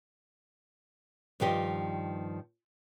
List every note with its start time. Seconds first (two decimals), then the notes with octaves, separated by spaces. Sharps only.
1.40 G2 D#3 F3 G4 D#5